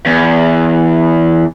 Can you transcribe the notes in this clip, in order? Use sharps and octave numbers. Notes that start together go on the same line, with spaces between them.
E2